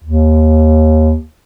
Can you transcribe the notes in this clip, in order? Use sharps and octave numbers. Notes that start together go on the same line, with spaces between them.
D#2